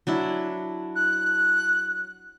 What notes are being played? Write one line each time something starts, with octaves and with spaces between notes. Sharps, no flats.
F#3 D4 E4
F#6